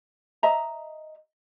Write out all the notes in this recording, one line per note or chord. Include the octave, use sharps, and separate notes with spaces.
D#5 E5 A#5